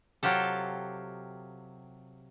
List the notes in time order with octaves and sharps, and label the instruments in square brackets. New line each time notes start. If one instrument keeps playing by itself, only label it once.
[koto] C3 F#3 F4 G4 A4